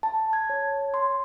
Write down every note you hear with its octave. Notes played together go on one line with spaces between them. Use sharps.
A5
G#6
C#5
C6